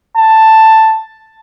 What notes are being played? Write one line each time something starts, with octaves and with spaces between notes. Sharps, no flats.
A5